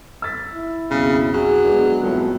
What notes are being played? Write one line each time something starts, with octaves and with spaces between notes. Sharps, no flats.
E6 A6 B6
E4
B1 F2 C#3
F#3 G#4
G#3 B3 D4
F2 A2 F#3 G#3 B3